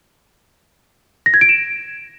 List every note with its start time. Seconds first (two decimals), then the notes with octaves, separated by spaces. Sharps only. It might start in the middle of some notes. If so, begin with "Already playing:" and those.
1.26 A#6
1.34 G#6
1.41 D7
1.49 E7